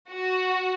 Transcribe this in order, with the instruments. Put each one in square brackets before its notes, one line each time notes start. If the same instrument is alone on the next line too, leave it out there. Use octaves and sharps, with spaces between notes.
[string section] F#4